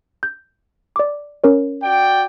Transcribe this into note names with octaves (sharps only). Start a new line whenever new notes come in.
G6
D5 D6
C#4 A#4 C#5
F#4 D5 G5